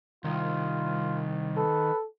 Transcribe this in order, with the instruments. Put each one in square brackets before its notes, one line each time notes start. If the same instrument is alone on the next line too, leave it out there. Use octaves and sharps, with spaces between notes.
[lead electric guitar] C2 [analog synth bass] D#3 [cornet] F4
[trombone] A4 [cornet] B4